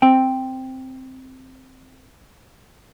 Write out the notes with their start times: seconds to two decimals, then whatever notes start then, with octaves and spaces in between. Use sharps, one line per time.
0.02 C4 G5